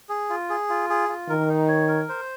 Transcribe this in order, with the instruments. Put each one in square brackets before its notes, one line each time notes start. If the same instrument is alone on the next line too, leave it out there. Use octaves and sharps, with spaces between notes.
[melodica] G#4
F4
G#4
F4
G#4
F4
[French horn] D#3 [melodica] A#4
[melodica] D#4
C#5
A#4
C5